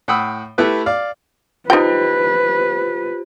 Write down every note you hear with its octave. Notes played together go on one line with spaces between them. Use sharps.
A2 F#5 G5 B5 D#6 E6
A3 E4 G4 B4 F#6
D5 F5
D#4 F4 G4 B4 C5 G5